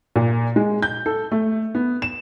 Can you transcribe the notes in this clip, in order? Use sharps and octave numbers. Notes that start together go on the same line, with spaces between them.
A#2
G#3
G6
A4
A3
B3
E7